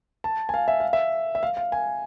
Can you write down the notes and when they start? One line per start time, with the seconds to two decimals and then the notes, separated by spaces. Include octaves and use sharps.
0.24 A5
0.49 G#5
0.54 F5
0.68 E5
0.80 F5
0.93 E5
1.35 E5
1.43 F5
1.57 F5
1.72 G#5